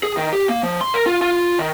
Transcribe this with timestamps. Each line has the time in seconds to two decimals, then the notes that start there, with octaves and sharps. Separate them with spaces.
0.03 G#4
0.17 D#3
0.33 G4
0.49 A#3
0.63 F3
0.81 C6
0.94 A#4
1.06 F4
1.22 F4
1.59 D#3